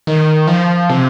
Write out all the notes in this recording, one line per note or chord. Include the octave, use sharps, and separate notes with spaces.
D#3
F3
C3